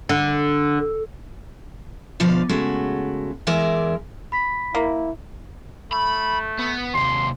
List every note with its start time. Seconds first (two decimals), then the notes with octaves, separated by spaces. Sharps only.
0.09 D3
2.20 D2 B2 F3 D5 F5
2.49 C#3 G#3 A3 F#4
3.47 E2 E3 G#3 A#4 D5 E5
4.32 B5 B6
4.75 A#3 E4
5.92 A3 B5
6.59 B3
6.94 D#2 C3 C6